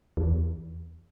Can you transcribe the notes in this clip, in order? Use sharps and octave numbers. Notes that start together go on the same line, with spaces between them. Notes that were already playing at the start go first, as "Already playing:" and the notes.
E2